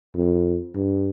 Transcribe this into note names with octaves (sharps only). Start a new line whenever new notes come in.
F2
G2